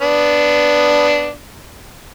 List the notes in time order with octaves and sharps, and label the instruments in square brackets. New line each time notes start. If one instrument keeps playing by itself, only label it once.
[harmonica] B3 D4